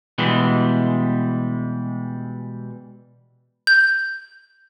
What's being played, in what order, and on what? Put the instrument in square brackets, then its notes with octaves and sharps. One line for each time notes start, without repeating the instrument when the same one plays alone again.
[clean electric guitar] B2 E3 G3 G#3
[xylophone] G6